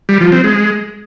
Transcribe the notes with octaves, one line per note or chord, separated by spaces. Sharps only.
G3
F3
C4
G#3